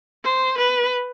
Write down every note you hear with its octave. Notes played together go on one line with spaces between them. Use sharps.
C5
B4